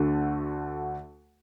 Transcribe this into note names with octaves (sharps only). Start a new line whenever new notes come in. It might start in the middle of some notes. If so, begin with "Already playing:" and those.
Already playing: D2 D3 A3 F#4